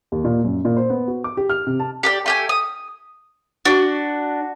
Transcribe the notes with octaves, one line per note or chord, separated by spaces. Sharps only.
D#2
A#2
F#2
A#2
C5
B3
F#4
D6
G4
F6
C3
A5
G4 B4 D5
A3 G4 G#5
D#6
D4 F#4